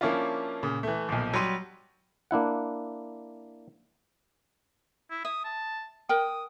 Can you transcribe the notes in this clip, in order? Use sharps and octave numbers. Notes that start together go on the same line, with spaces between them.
F3 A#3 C#4 D4 E4 F4
A#2 C#3
E3 A3
B1 A#2 F3
F#3 G3 C6 D#7
A#3 D4 E4 F#5
E4
E5 D#6
A5
A#4 G5 D#6